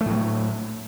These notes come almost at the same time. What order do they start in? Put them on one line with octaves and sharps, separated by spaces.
A3 A2 F#3